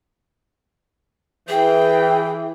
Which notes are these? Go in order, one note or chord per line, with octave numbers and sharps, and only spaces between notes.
E3 G#4 G5